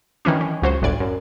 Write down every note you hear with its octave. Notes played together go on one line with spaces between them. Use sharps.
D#3 E3 C#4 D4
C#4
C#2 F#3 C5
G1 D2 A2 D5 G#6
F#2